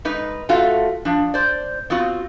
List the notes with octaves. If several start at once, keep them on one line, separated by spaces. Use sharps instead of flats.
G#2 D#4 B4
A3 F4 F#4 F5
F3 D4
C5 D5
B3 C4 F4 F#4